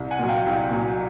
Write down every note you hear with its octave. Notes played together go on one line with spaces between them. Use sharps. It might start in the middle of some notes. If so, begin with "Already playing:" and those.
Already playing: C2
F#5 G#5
A#2 F#3
F5 G5
C2 F5 G5
A#2 F#3